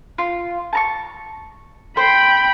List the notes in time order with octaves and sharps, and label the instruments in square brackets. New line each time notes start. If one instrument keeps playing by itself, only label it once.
[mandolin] F4
A5 A#5 C#6
[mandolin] C5 [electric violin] G5 B5